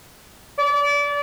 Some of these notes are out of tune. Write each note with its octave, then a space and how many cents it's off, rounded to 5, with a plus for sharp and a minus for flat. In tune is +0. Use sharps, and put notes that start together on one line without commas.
D5 -30